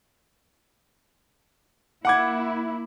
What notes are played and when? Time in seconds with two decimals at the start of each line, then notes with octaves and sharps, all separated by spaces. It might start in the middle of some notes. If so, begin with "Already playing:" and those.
2.05 A#3 E4 F#5 D6 G#6